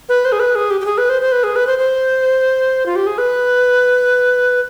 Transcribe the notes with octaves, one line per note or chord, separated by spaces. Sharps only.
B4
C5
G#4
B4
G#4
G4
G4
G#4
B4
C5
C5
B4
G#4
B4
C5
C5
F4
G4
G#4
B4